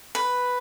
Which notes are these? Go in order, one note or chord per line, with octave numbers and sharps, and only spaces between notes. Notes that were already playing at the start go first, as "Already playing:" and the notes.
B4